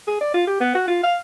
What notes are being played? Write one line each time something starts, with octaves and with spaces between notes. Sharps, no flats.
G#4
D5
F4
G4
B3
F#4
F4
F5